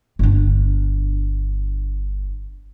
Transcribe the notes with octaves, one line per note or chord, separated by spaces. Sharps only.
G1 D4